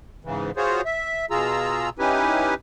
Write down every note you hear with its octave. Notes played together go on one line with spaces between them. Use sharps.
G#2 C#3 E3
F4 F#4 G#4 C5 C#5
E5
B2 F4 G#4 A#5 E6
C#4 D#4 E4 G4 B4 G#5